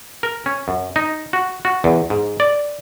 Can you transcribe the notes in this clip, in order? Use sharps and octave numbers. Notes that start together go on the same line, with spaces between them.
A#4
C#4
F#2
D#4
F#4
F#4
E2
G#2
D5